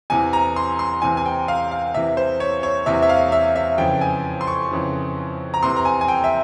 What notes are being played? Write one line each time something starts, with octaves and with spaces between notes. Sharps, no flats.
E2 C3 E3 G#5
A#5
C6
C6
E2 C3 E3 G#5
G#5
G5
F5
F5
E2 C3 E3 E5
C5
C#5
C#5
E2 C3 E3 E5
E5
F5
E5
E5
F2 C#3 E3 G5
G#5
C6
C#6
F2 C#3 E3
A#5
E2 C3 E3 C6
A#5
G#5
G#5
G5
E5